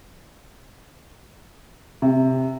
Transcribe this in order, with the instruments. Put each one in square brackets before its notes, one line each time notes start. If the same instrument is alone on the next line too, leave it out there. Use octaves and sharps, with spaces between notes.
[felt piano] C3